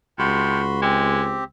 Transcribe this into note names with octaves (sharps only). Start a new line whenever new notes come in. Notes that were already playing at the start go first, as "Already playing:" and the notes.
C#2 C3 F#4 B5 C6
G#3 C4 G4